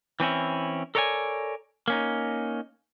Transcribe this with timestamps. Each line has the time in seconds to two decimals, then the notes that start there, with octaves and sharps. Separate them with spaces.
0.20 E3 C4 C#4 E4
0.95 A4 A#4 C#5 D5 F5 G#5
1.88 A#3 C#4 D#4